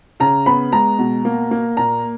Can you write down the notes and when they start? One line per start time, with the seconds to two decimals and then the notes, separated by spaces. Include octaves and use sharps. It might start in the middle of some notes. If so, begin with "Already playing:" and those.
0.20 C#3 A#5
0.46 B3 B5
0.72 G#3 A#5
0.99 B2
1.25 A#3
1.51 A#3
1.77 A#2 A#5